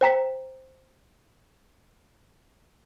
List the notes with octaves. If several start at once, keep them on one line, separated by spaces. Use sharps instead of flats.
C5 G5 A#5 B6